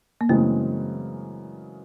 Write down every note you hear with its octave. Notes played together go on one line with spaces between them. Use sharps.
A#3
F#2 C#3 E3 G#3 A3 C4